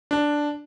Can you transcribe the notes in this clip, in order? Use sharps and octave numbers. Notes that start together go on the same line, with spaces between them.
D4